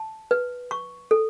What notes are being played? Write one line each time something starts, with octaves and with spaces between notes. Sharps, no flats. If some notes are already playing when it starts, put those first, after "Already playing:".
Already playing: A5
B4
C#6
A4